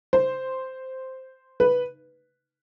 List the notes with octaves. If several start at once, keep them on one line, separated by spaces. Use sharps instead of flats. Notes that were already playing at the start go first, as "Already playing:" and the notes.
C5
B4